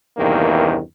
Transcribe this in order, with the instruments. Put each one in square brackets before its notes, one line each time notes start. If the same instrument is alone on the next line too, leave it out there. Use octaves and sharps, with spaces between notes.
[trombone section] E2 G2 C3 D#3 A#3